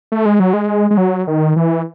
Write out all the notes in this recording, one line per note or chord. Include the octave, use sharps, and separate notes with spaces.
A3
G#3
F#3
G#3
G#3
F#3
D#3
E3